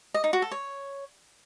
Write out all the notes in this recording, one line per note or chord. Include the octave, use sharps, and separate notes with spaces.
D#5
D#4
F#4
A4
C#5